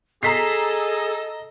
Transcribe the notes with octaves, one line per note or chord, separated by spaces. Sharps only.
G#4 A4 D#5 A#5 B6 C7